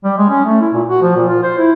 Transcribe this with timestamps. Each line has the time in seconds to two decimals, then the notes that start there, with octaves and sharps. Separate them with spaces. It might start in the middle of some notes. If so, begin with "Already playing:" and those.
0.04 G3
0.18 G#3
0.30 C#4
0.45 A3
0.61 E4
0.74 A#2
0.89 F#4
1.02 F3
1.16 A#2
1.28 F4
1.43 C5
1.58 E4